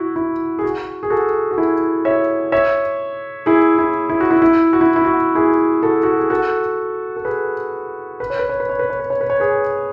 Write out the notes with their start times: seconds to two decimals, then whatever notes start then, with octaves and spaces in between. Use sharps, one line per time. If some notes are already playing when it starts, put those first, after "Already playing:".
Already playing: E4 F#4
0.16 E4
0.59 G#4
0.63 F#4
1.03 G#4
1.10 F#4 A4
1.51 F#4
1.58 E4 G#4
2.05 C#5 E5
2.52 C#5 E5
3.46 E4 G#4
3.78 E4
4.09 E4
4.21 F#4
4.31 E4
4.42 E4
4.73 F#4
4.81 E4
4.96 E4
5.05 F#4
5.35 E4 G#4
5.83 F#4 A4
6.03 F#4
6.17 G#4
6.30 F#4 A4
7.16 A4
7.25 G#4 B4
8.20 B4
8.30 C#5
8.39 B4
8.49 C#5
8.60 B4
8.69 C#5
8.79 B4
8.90 C#5
9.00 B4
9.10 C#5
9.21 B4
9.30 C#5
9.40 G#4 B4